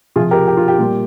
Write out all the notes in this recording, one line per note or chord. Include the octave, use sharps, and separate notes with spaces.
C3 F3 F4 G#4
G4 A#4
G4
F4
G4
A#2 G3